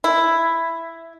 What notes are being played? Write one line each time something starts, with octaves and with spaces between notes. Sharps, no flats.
E4